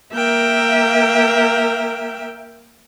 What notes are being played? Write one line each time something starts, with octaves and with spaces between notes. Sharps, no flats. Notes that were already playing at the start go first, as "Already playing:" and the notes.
A#3 A#4 E5 G5